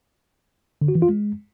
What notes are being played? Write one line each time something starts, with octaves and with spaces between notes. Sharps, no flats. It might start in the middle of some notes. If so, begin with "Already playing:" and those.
D3
F#4
E3
F4
G#3